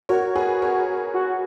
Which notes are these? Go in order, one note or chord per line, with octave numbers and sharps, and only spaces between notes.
F#4 A#4 C#5
G#4 B4
A#4 C#5
F#4